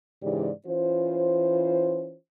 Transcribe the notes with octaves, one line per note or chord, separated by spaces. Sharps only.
G#2 C#3 E3 G4 D5
E3 C#4 F4 C5